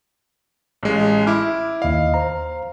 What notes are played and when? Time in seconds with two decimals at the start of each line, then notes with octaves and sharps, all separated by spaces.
0.83 A1 G#3
1.27 E4 D6 F6
1.82 D#2 D#5 F5
2.14 C5 A#5